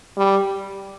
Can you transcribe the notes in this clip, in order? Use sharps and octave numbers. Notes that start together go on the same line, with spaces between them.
G3